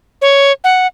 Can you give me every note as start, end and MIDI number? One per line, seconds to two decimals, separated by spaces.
0.22 0.52 73
0.64 0.87 78